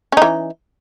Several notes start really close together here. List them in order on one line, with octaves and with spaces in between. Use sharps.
C#4 D#4 E3